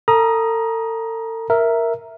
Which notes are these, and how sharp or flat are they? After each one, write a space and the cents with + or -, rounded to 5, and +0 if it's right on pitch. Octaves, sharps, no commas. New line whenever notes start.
A4 +40 A#5 +25 D#6 +0
A#4 +0 E5 +0